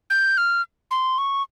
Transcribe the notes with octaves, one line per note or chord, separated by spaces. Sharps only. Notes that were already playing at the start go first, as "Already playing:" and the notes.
G6
F6
C6
C#6